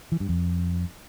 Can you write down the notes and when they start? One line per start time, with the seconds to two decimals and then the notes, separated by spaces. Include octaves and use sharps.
0.12 E3
0.20 G2
0.29 F2